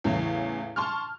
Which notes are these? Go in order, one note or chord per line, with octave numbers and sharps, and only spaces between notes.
E2 A2 C#3 E3
A5 C6 C#6 F6